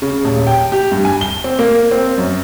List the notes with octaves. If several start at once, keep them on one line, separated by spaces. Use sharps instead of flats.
C#3
D#1
G5
G4
G2
G#5
G7
C4
A#3
C4
F#2